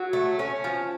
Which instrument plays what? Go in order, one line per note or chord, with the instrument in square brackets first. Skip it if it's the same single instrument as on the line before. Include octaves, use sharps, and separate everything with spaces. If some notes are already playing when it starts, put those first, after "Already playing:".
Already playing: [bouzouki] F#3
A3
C#4
F3